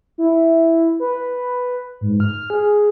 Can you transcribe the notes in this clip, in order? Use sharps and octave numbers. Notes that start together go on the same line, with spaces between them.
E4
B4
G#2
F6
G#4